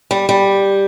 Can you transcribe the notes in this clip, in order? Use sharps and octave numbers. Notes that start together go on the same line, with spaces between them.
G3
G3